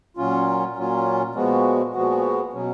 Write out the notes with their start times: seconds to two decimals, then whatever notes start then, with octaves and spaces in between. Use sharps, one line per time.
0.17 A#2 F#3 C#4 F4
0.76 A#2 F#3 C#4 F4
1.35 A#2 F3 G#3 B3 F#4
1.93 A#2 F3 G#3 B3 F#4
2.53 B2 F#3 C#4